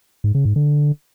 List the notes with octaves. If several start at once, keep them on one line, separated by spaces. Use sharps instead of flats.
G#2
C#3
G#2
D3